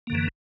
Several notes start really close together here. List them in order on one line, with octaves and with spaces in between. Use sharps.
A#3 D3 F#2 E3